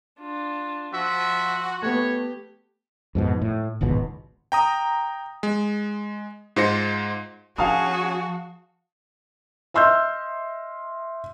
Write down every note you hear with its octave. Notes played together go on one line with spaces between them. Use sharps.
D4 F4
F3 F#4 E5
A3 B3 G4 C#5
F2 G#2 B2
A2
D1 G#1 C#2 B2
G5 A#5 D#6
G#3
G#2 G#3 F4 C5 A#6 C#7
F3 C#4 F#4 G#4 F5 A5 D#6
D#5 E5 C6 E6 F6 G6